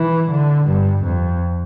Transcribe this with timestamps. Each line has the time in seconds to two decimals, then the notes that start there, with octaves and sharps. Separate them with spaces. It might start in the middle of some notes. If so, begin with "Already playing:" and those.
Already playing: E3
0.31 D3
0.68 G2
1.05 F2